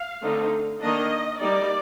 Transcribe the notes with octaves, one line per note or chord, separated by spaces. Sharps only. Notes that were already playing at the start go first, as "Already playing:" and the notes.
Already playing: F5
D3 A3 C4 D#4
D#3 A#3 D4 D#5
G3 A#3 D#4 D5